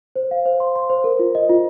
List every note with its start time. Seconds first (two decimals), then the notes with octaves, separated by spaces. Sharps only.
0.16 C5
0.31 F5
0.45 C5
0.60 C6
0.76 C6
0.89 C5
1.04 A#4
1.19 F4
1.35 D#5
1.49 F4